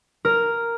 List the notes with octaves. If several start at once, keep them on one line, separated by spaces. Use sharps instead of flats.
A#4